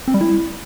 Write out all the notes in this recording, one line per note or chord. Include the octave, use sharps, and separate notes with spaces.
C4
G3
E4